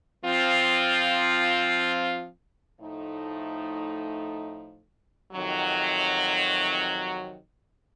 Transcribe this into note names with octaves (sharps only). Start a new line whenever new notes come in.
F3 C4 F4
A2 F3 A3 D#4
F2 C3 D#3 F#3